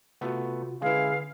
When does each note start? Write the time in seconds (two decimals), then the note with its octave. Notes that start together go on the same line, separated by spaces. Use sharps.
0.21 C3 A3 B3 F4 F#4
0.82 D3 G#3 C#4 E4 G#4 B4 F5